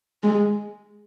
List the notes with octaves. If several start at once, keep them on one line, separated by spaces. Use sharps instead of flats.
G#3